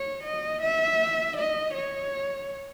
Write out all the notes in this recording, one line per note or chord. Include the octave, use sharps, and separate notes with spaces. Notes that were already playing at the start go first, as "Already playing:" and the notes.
Already playing: C#5
D#5
E5
D#5
C#5